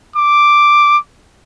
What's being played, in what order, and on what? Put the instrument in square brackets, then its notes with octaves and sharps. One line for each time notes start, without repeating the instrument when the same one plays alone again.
[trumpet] D6